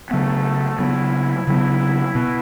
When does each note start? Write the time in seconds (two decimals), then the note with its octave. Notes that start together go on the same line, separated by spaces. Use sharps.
0.11 C#3 F#3 A3 B3
0.79 C#3 F#3 B3 E4
1.47 C#3 F#3 B3 E4
2.15 B2 B3